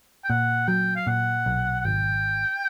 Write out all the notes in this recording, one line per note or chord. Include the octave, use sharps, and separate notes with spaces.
G5
A#2 F#5
F#3 G5
F5
A#2 F#5
B1
F#5
G#1 G5